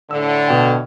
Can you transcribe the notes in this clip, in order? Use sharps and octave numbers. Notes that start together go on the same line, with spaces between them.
A2 D3 E6
B2 G5